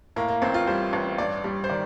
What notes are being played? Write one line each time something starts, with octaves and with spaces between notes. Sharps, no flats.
A2 A#3
A#3
A1 C4
F4
G3 C5
A1
G2 D5
G3
C5
D#3 D5